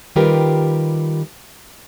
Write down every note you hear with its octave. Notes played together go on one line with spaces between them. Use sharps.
D#3 G3 F4 G4 A#4 B4